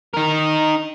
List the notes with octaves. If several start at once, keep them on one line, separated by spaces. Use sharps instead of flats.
D#4 A#4